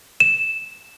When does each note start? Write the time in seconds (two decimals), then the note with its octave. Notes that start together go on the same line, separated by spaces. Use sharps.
0.20 E7